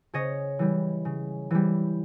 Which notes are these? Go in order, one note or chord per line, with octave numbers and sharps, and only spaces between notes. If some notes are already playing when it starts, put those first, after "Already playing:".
C#3 C#5 D#5
E3 G3
C#3
E3 G3